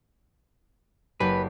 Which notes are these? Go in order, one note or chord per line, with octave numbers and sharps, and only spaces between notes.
F#1 G4 B4 C7